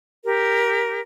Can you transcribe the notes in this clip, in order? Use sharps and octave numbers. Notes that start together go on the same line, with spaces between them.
G4 A#4